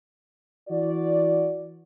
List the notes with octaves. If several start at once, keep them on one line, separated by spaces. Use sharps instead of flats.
E3 F#4 D5